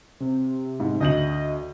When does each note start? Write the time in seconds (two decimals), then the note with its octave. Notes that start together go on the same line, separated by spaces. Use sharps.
0.20 C3
0.80 G#2
1.01 D2 D#5 G6 F#7